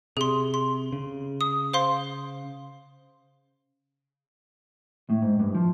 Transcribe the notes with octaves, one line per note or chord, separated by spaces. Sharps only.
C3 G#4 C6
C6
C#3
D#6
C5 F5 C6
A2
G#2
G2
F3